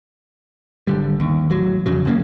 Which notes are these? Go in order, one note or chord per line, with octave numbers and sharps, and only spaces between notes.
G#1 D3 G3
D#2
A1 F#3
F2 C#3 F#3
F1 F#2 C#3 A#3